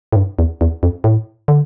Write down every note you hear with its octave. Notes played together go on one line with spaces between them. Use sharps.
A2
G2
E2
E2
F2
A2
D3